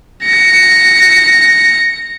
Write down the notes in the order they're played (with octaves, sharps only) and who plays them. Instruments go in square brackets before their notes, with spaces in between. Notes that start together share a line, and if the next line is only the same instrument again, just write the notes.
[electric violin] A#6 C#7